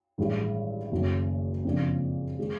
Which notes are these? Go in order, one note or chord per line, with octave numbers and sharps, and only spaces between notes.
A1 G2 D#3 G#3
F#1 F#2 D#3
F2 C#3 F3 A#3 D4
D#3 G#3